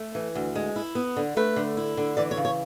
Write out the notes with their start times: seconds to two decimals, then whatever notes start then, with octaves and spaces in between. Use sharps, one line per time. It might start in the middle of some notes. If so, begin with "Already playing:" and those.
Already playing: A3
0.15 E3
0.35 D2
0.56 G#3
0.76 E4
0.95 B3
1.17 D3
1.37 A3 B4
1.56 D3
1.77 E4
1.97 D3
2.17 E3 D5
2.31 C#5
2.37 C#3
2.45 C#5